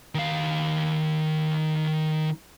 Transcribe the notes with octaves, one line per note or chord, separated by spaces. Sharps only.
D#3 F5